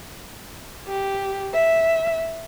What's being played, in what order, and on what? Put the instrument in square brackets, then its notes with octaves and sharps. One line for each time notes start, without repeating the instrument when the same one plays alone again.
[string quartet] G4
E5